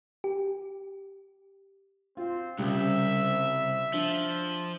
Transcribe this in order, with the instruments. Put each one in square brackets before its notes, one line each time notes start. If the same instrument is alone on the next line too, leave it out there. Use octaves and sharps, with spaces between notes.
[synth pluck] G4
[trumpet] C4 [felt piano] F4
[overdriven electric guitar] C2 [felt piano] C#3 G3 [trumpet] E5
[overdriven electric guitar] F3 [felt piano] D4